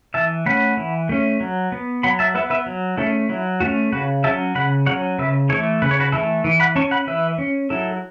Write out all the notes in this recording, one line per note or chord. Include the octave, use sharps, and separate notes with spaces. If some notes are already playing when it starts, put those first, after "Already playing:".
E3 E5 A5
A3 C#4 F#5 B5
E3
A3 C#4
F#3
B3
F#3 F#5 B5
E5 A5
B3 B4 E5
B4 E5
F#3
A3 C#4 E4 A4
F#3 E4
A3 C#4 F#4
C#3 F#4 B4
F#3 C#4 E5 A5
C#3 F#5 B5
F#3 C#4 C#5 F#5
C#3 B4 E5
E3 A3 A4 C#5
C#3 B4
C#5
F#4 B4
E3 A3 E4 A4
E3
F#5 B5
C#4 A5 C#6
F#5 B5
E3 B4 E5
C#4
F#3 E4 A4